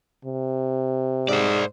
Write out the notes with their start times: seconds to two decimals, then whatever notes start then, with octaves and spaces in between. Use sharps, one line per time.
0.25 C3
1.28 G#2 C5 D5